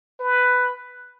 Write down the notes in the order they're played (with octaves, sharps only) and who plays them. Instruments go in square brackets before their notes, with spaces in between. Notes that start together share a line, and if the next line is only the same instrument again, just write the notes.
[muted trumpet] B4